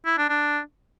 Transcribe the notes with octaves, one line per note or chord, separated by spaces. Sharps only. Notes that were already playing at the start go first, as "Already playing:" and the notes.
E4
D4
D4